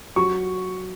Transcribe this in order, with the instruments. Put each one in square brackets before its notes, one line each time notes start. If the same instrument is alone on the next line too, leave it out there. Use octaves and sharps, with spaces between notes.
[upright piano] F#3 C#6